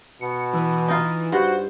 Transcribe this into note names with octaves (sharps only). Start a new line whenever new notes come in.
B2 C#7
E3
D#4 F4
G2 F#4 C5